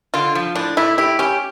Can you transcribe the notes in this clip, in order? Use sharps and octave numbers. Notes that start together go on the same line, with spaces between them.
D3 F4
F3
A2 D4
A2 E4
E4 G4
C#4 G4